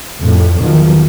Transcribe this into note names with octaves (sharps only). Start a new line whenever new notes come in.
F2 A2
E2 D#3 F3 F#3